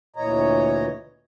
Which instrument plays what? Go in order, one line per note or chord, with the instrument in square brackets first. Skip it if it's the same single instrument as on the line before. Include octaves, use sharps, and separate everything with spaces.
[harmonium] D2 A#2 E3 C#5 D#5 A#5